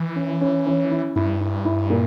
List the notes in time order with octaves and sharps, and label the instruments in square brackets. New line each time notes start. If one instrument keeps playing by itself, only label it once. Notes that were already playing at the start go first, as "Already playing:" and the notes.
Already playing: [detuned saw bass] E3
[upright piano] C#4
C#4
C#4
E4
[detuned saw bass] G2 [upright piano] E4
[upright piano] E4
E4
A#2